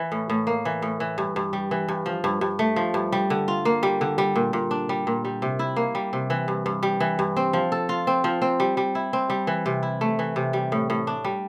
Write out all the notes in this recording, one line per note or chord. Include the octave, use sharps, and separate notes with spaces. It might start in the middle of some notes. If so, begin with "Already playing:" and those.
Already playing: E3
A2
A2
A#3
E3
A2
E3
G2
G2
G3
E3
G2
F3
G2
G2
A3
F3
G2
G3
D3
F4
A#3
G3
D3
G3
A#2
A#2
D4
G3
A#2
G3
C3
E4
A#3
G3
C3
E3
G2
G2
G3
E3
G2
C4
F3
A4
F4
C4
F3
C4
G3
G3
E4
C4
G3
E3
C3
E4
A3
E3
C3
G3
A2
A2
D4
G3